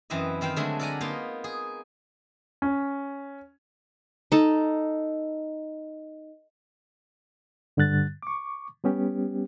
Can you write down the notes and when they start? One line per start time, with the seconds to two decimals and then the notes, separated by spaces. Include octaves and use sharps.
0.10 F#2 E3 C4 E4 D#5
0.41 D#3 C4 F5 G5
0.56 D3 F#3 G#3 A3 D4
0.79 A4 A#4 D5 F#5 G#5 A#5
1.01 A#3 B3 D#4 F4
1.44 G#4
2.62 C#4
4.32 D#4 A4
7.77 G2 D3 G3 F#6 A6
8.23 C#6 D6
8.84 G3 B3 C#4 G4